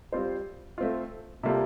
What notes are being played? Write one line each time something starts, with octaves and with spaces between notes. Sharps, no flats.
G3 C4 F4 C5
A3 C4 F4
C3 G3 A#3 F4 A4